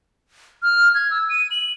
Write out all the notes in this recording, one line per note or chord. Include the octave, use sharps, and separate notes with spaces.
F6
G#6
E6
D#7
F#7